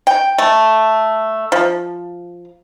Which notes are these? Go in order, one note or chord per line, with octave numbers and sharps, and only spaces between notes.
G5
A3
F3